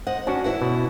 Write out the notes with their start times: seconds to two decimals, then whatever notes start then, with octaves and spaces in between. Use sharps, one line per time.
0.07 C5 D#5 F#5
0.27 C#4 D4 F#4
0.44 E4 B4 F#5
0.62 B2